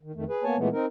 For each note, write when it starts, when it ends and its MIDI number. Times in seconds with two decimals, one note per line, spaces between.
0.03 0.12 51
0.15 0.24 41
0.15 0.24 51
0.15 0.24 57
0.29 0.44 68
0.29 0.44 71
0.44 0.56 58
0.44 0.56 59
0.44 0.56 73
0.44 0.56 80
0.44 0.56 81
0.57 0.69 46
0.57 0.69 52
0.57 0.69 56
0.57 0.69 57
0.57 0.69 59
0.73 0.86 60
0.73 0.86 63
0.73 0.86 70